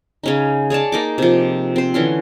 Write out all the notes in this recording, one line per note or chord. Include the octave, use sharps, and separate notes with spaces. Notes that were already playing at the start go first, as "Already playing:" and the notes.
C#3 C#4 D#4
G#4 C#5 D5 A5
A#3 D#4 D6
C3 F3
C4 C5
D3 E3 C#4 C6